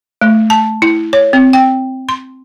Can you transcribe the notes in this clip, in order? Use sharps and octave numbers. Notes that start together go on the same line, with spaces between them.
A3
A5
E4
C#5
C4
G5
C6